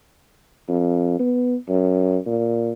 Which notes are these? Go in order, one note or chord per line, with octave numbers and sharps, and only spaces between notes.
F2
B3
F#2
A#2